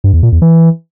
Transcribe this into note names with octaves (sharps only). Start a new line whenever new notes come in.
G2
E2
A#2
E2
E3